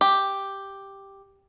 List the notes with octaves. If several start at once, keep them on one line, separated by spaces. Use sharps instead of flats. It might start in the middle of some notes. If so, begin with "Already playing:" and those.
G4